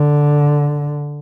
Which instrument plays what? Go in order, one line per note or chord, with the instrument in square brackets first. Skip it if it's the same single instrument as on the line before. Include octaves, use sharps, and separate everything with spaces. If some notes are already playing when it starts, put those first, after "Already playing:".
Already playing: [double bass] D3